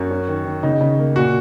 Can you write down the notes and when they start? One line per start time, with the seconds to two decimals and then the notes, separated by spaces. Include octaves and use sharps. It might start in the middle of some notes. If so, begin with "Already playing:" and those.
Already playing: F#2 F#4
0.10 C#4
0.28 D#3
0.45 D#3
0.63 C#3 D#4
0.81 C#3
0.99 A#3
1.16 A#2 F#4